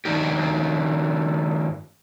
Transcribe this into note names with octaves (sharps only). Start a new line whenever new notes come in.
G2 D#3 G#3 D4 D#4 G4